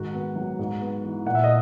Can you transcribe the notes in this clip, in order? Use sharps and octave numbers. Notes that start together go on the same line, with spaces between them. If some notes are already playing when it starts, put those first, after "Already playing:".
Already playing: G#2 D#3 F#4 F#5
B3
F#3
G#2
B3
E3
A#2 F#5
E5
D#5